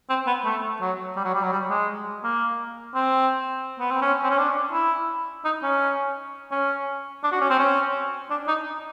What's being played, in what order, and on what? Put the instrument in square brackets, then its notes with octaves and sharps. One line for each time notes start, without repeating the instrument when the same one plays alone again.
[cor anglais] C4
B3
A3
F#3
G3
F#3
G3
F#3
G3
G#3
A#3
C4
B3
C4
C#4
C4
C#4
D4
E4
D#4
C#4
C#4
D4
F#4
C#4
C4
C#4
D4
D#4